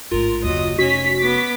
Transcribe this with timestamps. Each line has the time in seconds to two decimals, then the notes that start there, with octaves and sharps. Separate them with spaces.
0.11 A1 G#2 F4 A#4
0.44 F#1 D#2 F#3 D#5
0.78 F1 C#4 F#4 B6
1.21 B3 D6